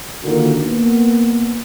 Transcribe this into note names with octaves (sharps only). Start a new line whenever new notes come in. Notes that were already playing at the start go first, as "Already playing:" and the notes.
A#2 D3 D#3 A#3 F4 F#4
A#3 B3